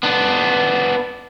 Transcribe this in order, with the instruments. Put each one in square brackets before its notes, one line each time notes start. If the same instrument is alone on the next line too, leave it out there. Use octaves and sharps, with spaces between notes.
[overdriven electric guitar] B3 D4